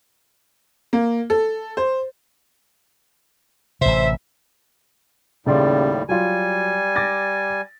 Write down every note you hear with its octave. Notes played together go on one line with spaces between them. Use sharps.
A#3
A4
C5
A1 C3 C5 E5
D#2 A2 C#3 G3 D5 C6
F#3 G3 F4 G#5
D6 A6 A#6